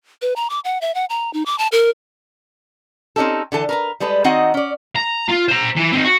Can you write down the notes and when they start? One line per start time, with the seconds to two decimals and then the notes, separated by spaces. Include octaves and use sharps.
0.22 B4
0.36 A#5
0.50 D6
0.64 F#5
0.81 E5
0.95 F#5
1.10 A#5
1.33 D#4
1.46 D6
1.59 A5
1.72 A#4
3.16 C4 C#4 D#4 G4 A4
3.52 D3 E3 A4 A5
3.69 A#4 B4 A#5
4.00 G3 G#3 A4 B4
4.24 D#3 C4 D#4 F#4 D#5 F#5
4.54 C#4 D5
4.96 A#5
5.29 F4
5.49 C5 A#5
5.77 E3
5.92 C4 D#4
6.05 F#4